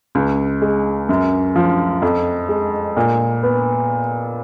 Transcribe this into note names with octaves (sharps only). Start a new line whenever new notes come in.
C#2
G#3
F#2
F3
F2
G#3
A#2
B3